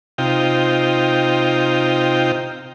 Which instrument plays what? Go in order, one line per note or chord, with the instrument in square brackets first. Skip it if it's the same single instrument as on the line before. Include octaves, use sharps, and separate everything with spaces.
[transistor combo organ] C3 D#4 F4 G5